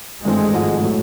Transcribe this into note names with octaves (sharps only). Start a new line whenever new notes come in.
G#1 G2 E3 G#3 A3 C4
G#1 G#2 F3 A3
A2 F#3 A3